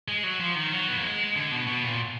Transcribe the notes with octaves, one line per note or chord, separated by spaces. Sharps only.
G#3
F#3
F3
D#3
F#3
B3
A#3
G#3
D3
B2
B2
A#2